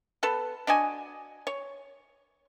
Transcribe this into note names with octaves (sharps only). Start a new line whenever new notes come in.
B3 A4 B4
D4 F#4 D#5 G#5
C#5